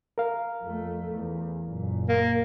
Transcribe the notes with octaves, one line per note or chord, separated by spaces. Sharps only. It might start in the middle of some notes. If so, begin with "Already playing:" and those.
A#4 F5
F2 A3
E2
F#1 A#2
A#3